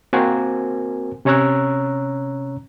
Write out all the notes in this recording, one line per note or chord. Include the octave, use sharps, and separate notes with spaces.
A#3 C4 F#4 A#4 C5 G#5
C3 C#4 C#5 A#5 E6 F#6